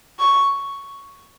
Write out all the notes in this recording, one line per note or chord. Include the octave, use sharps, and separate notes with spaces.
C#6